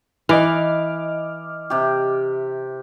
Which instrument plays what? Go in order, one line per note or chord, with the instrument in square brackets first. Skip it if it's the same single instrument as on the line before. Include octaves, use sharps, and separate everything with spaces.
[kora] E3 [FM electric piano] D#5 D6 F6
[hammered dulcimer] C3 G4